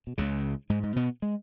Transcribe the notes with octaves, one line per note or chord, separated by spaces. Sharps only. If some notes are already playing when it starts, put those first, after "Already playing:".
B2
C#2 C#3
G#2 G#3
G#2 G#3
B2 B3
G#3